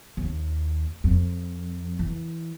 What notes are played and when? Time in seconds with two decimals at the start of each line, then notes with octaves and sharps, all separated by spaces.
0.17 D#2
1.04 F2
1.99 E3